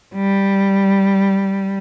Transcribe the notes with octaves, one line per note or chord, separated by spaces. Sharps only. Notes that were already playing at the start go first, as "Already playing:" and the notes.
G3